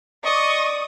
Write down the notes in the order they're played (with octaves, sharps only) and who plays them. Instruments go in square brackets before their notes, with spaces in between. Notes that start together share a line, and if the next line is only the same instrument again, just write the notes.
[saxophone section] D5 [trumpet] D#5 [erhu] C#6 [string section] D#6